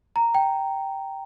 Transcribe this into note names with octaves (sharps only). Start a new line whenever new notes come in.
A#5
G5